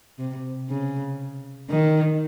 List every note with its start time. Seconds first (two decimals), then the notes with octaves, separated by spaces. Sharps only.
0.19 C3
0.69 C#3
1.70 D#3